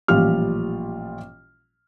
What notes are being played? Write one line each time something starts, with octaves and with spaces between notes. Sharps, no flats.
A1 A#2 F3 G3 F4 F6